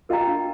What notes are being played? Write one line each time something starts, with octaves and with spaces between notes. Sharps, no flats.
F4 A#4 D#5 G5 A#5
D4